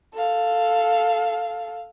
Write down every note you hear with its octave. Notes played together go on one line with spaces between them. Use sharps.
A4 F5